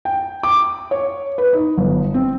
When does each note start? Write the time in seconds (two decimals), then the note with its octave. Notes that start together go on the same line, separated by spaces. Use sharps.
0.05 G5
0.43 D6
0.91 C#5
1.38 B4
1.53 D#4
1.77 G1
2.14 C4